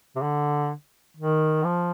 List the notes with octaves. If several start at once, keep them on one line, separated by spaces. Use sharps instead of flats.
C3
D3
D#3
F3